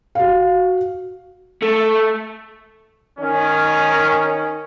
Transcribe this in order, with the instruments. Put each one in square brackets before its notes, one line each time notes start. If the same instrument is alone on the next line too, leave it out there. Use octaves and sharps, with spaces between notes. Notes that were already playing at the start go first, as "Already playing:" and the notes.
[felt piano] F#4 F5
[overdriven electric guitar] A3
[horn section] D#3 C#4